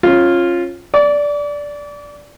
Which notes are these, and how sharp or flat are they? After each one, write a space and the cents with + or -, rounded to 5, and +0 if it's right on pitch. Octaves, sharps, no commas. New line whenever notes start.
C#4 -25 F4 +0
D5 -10 D6 -40